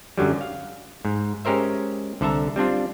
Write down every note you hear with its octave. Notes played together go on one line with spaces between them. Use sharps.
F#2 D3 F#3 G3
F5
G#2
G#3 C#4 G4 A#4 C5 E5
C2 D3 A4 E5 A5 A#5
G3 C4 D4 F4